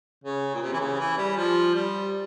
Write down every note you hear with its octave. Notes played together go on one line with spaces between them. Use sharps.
C#3
A#2
C3
E3
C#3
E3
G3
F3
G3